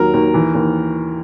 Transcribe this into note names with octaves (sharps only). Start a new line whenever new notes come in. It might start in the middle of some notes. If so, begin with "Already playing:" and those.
Already playing: D#2 F#3 A#4
D#2
E3
D#2